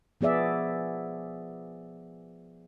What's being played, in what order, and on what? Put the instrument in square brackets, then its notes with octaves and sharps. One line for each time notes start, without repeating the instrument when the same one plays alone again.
[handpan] F3 B3 G#4 D5 E5